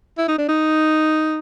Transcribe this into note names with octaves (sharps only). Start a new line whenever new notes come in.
E4
D#4
D4
D#4